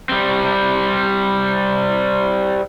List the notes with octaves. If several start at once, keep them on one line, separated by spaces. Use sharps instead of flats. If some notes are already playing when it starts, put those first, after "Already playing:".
G3 C4